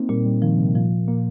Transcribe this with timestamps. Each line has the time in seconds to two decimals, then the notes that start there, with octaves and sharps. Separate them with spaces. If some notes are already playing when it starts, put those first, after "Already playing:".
Already playing: A#3 C4 D#4
0.09 A#2 G3
0.25 G3
0.42 D#3 F3
0.58 C3
0.75 A#2 F3
1.08 A#2 A#3